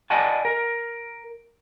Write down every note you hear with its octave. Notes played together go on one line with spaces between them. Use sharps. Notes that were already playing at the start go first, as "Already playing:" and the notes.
D5 D#5 F#5 G#5 A5
A#4